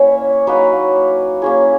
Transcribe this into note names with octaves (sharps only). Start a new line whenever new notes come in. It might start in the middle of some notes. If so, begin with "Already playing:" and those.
Already playing: A#3 C#4 E4 C#5
F#3 A#3 D#4 B4
A#3 C#4 E4 G#4